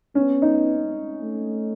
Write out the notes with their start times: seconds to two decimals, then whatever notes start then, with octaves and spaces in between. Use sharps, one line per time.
0.15 B3 C#4
0.42 D#4
1.21 A3